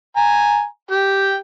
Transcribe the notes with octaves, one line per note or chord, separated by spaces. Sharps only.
G#5 A#5
G4 G5